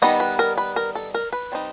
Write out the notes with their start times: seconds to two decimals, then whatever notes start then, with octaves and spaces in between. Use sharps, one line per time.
0.02 D#3 G3 B3 D#4 D#5
0.20 B4
0.39 A#4
0.57 B4
0.76 A#4
0.95 A4
1.14 A#4
1.33 B4
1.52 G3 C4 D#4